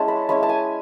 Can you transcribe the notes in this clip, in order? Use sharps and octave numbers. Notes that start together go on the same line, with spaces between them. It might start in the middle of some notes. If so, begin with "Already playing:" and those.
Already playing: G#3 C#4 E4 A5
B5
G#3 C#4 E4 B5
A5
G#5